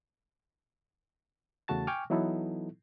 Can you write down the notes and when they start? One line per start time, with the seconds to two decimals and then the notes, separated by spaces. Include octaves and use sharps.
1.68 E2 C#3 A3 F#4 A5 A6
1.87 G5 G#5 C#6 D6 F6
2.10 E3 F#3 B3 D#4 E4 A4